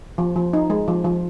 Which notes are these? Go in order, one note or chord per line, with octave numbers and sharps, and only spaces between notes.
F3
F3
D#4
G#3
F3
F3